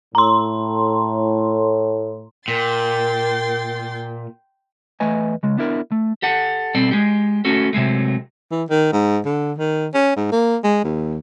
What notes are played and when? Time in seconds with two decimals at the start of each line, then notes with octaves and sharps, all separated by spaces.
0.15 A2 A#5 C6
2.48 A#2 A#4 G5 C6 A6
5.00 E2 A3 B4 D#5 G#5
5.43 C#3 G#3
5.57 B3 D4 E4 A#4
5.92 A3
6.22 G4 A4 F#5
6.75 B2 G3 C4 A4 D5
6.91 G#3 G4
7.45 A3 C#4 F#4 A4
7.73 C3 F#3 G#3 A3
8.51 E3
8.70 D#3
8.93 G#2
9.25 D3
9.58 D#3
9.94 C#4
10.16 G#2
10.32 A#3
10.64 G#3
10.84 D#2